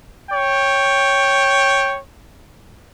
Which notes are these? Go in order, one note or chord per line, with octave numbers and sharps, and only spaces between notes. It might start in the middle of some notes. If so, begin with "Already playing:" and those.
C#5 G5